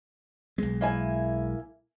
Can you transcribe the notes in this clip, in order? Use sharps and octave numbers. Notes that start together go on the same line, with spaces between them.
B1 G#3
A#3 E4 G#5